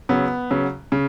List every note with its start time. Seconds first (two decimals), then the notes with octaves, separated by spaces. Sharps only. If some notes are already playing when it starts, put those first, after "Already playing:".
0.09 C#3 F#3 B3
0.51 C#3 F#3
0.92 C#3